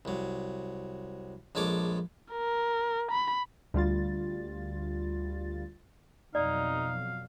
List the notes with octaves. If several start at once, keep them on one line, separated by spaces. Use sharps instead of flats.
C2 F#3
A#1 G#3 A4 C#5 D6
A#4
B5
D2 G3 F4 A6
F2 B2 F#3 D#4 D5 F5